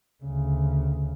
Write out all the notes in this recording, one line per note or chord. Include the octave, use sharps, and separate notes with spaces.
D2 C#3